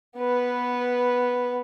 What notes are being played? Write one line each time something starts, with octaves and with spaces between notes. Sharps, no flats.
B3 B4